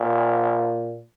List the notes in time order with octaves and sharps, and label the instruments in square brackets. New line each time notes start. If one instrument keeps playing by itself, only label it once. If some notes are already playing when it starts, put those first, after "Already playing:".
Already playing: [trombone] A#2